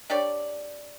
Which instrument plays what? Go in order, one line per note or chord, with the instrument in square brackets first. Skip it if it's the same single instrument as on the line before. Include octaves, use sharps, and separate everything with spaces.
[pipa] D4 G4 C#5 D5